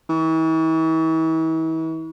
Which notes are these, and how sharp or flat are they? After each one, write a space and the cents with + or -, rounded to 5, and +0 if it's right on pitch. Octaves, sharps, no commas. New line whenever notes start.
E3 -40